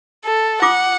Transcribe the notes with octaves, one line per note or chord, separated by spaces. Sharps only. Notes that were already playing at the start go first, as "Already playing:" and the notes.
A4
F4 F#5 D6 D#6